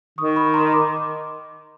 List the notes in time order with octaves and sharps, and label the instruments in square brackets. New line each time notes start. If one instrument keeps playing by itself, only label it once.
[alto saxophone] D#3 [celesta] C#6 D#6
[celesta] B5 C#6
A#5 C6
C6 D6